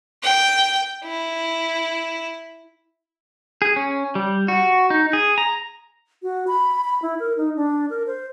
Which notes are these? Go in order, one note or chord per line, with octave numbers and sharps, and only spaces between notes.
G5
E4
G#4
C#4
G3
F#4
D#4
G#4
A#5
F#4
B5
B5
E4
A#4
D#4
D4
A#4
C5